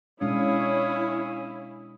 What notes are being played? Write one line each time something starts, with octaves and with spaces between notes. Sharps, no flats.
B2 G#3 C#4 D4 E4 C#5 F5 D#6